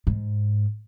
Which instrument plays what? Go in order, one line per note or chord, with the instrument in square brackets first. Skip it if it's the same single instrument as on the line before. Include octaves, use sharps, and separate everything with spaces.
[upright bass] G#2